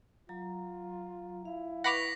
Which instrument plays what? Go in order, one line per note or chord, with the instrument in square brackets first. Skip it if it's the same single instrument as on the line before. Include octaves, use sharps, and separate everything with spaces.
[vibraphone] F#3 A#5 [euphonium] F4
[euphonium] E4 [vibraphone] F5
[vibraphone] B4 C#6 [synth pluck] F#5 B5 D6 [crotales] A#6 B6 F7